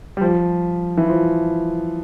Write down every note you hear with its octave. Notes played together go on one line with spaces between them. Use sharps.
G3
F3
E3
F3